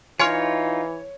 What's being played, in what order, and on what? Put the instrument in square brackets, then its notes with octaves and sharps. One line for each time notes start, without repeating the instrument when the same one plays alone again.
[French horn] E3 [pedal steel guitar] D#4 F4 [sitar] C#5 [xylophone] G#5 C6 F6